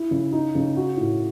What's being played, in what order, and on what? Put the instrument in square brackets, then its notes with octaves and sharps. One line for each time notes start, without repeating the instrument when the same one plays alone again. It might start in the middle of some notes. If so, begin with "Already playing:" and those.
Already playing: [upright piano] E4
C#3
D#4
C#3
F#4
A2